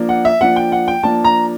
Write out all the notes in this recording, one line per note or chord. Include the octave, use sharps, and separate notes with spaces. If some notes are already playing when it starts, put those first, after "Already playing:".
Already playing: F3 A#3 D4
F#5
E5
F3 A#3 D4 F#5
G5
F#5
G5
F3 A#3 D4 A5
A#5